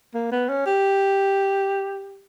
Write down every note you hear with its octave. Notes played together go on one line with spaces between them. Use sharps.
A#3
B3
C#4
G4